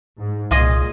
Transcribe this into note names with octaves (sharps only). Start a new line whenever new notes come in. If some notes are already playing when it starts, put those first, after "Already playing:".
G#2
C2 A#2 F4 G#4 D#5